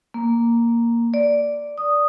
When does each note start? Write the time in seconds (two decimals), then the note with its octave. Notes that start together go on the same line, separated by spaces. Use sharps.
0.14 A#3
1.14 D5
1.78 D#6